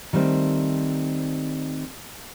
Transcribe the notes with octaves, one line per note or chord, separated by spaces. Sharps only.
D#3 G3 A3 C4